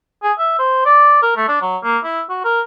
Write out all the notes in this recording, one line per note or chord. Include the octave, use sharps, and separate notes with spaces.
G#4
E5
C5
D5
A#4
A3
D4
F#3
A#3
E4
F#4
A#4